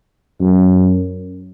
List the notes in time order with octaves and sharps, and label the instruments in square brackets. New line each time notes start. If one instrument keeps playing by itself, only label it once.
[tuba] F#2